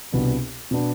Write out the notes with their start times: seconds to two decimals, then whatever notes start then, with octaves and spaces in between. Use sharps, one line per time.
0.12 C2 B2 B3 D4
0.71 B2 B3 D4